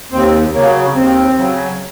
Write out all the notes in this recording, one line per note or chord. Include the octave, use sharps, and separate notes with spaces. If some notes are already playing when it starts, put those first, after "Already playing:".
D#2 C4
C#3 F#3 A#3
D#2 C4
C#3 F#3